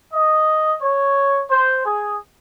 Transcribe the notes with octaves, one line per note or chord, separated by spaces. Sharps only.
D#5
C#5
C5
G#4